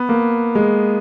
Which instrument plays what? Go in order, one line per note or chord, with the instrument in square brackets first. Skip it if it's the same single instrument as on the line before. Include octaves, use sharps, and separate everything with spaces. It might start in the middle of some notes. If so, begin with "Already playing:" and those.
Already playing: [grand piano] B3
A#3
G#3